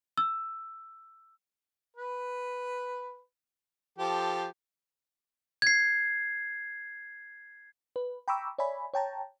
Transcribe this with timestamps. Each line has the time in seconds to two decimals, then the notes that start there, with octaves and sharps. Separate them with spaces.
0.17 E6
1.95 B4
3.98 F3 G4 A4
5.62 G#6 C7
7.96 B4
8.28 G5 A#5 B5 C#6 D6 E6
8.59 C#5 D5 E5 G#5 B5
8.94 C#5 G5 A5 A#5